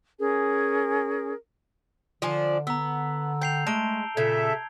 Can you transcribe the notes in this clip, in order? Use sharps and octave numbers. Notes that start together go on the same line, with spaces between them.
C#4 G#4 A#4
D3 F3 D4 G#5
B3 A#5 E6
G5 G6 C7 F7
G#3 A3 A5 D7 G7
A#2 C#3 A4 E5 G#6